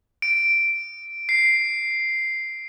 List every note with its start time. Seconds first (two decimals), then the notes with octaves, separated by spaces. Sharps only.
0.22 D7
1.29 C7